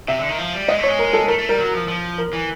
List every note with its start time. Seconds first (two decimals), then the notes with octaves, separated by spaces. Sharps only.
0.08 C3 E5
0.19 D3
0.29 D#3
0.38 F3
0.54 G3
0.68 G#3 D#5
0.78 A3
0.83 C#5
0.88 G#3
0.99 A#4
1.13 A4
1.28 A3 A#4
1.39 A3
1.49 G3 A#4
1.58 F#3
1.74 F3
1.88 F3
2.18 A#4
2.33 E3